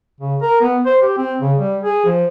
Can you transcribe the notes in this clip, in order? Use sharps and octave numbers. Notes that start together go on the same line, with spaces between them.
C#3
A#4
B3
C5
G4
C4
C#3
G3
G#4
F3